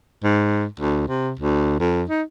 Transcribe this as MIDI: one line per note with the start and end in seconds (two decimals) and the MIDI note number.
0.24 0.65 44
0.80 1.04 38
1.08 1.32 48
1.40 1.76 38
1.79 2.03 41
2.09 2.22 63